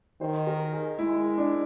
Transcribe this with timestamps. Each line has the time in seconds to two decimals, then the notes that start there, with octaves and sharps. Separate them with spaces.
0.21 D#3 C5
0.47 A#4
0.73 G#4
0.99 G#3 E4
1.38 D4